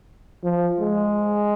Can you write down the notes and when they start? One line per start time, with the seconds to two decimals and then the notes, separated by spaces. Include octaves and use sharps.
0.44 F3
0.80 G#3